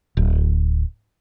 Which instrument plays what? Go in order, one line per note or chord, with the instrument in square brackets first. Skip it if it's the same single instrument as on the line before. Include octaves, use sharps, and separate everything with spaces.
[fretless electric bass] D1